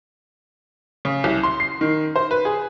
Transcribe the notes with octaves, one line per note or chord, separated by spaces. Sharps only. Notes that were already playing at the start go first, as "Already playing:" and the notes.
C#3
C2
C6
C7
D#3
C5
B4
G#4